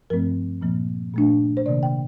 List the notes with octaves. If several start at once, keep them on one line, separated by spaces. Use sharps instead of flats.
G2 F3 A3 C4 A#4
A#2 F3 A#3
A#2 A3 D4
C5
C3 D#3 A#3 D5
G5